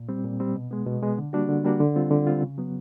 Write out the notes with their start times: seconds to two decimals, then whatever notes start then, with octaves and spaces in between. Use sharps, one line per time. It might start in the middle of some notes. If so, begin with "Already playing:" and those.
Already playing: A#2
0.09 G3 C4
0.24 A#2
0.40 G3 C4
0.56 B2
0.71 G#3 B3
0.86 B2
1.03 G#3 B3
1.18 D3
1.33 G3 A#3 D4 F#4
1.49 D3
1.65 G3 A#3 D4 F#4
1.80 D3
1.96 G3 C4 F4
2.11 D3
2.27 G3 C4 F4
2.43 C#3
2.58 F#3 B3